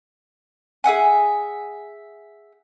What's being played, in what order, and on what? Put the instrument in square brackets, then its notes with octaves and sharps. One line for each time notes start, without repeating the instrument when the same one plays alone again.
[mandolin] G#4 E5 F#5 G#5